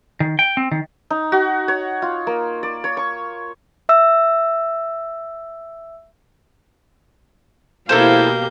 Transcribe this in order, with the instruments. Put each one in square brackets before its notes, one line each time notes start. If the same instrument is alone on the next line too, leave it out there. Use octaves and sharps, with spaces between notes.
[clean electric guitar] D#3
G5
C4
D#3
[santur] D#4
F#4
C#5
F4
A#3
D5
C#5
C#6
[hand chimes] E5 E6
[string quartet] B2 A#3 G6 [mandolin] E4 A4 C5 [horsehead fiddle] G4 F5